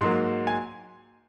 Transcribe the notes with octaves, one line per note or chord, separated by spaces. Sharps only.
G#2 F#3 A#3 C6
G#5